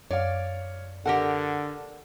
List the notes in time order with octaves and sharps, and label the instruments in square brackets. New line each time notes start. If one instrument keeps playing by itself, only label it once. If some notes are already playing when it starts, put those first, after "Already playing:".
[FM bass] F#2 [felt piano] C#5 F5 [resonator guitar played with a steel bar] D5
[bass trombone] D3 [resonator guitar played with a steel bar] G4 A#4 F#5 [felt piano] A4